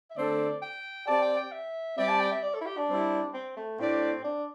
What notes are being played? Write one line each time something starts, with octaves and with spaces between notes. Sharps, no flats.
E5
D3 A3 C4 A4 D5
G5
C4 G4 D5 A5
G5
G5
E5
G3 C4 G4 D5 E5
A5
G5
E5
D5
A4
E4
G4
D4
G3 C4 E4
C4
A3
A2 A3 C4 D4 G4 D5
D4